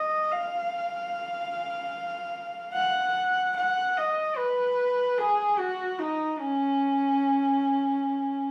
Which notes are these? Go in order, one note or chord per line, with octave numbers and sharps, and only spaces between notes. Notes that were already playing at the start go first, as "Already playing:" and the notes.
Already playing: D#5
F5
F#5
F#5
D#5
B4
G#4
F#4
D#4
C#4